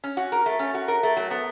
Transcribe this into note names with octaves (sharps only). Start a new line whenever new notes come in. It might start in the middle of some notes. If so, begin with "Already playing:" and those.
C#4
F#4
A#4
A3
C#4
F#4
A#4
A3
F#3
B3